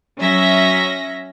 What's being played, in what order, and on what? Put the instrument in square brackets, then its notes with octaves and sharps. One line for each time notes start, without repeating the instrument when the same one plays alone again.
[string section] F#3 C#4 E5 A#6